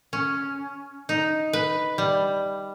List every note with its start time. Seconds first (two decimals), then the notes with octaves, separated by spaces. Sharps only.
0.13 C#4
1.09 D#4
1.53 B4
1.98 G3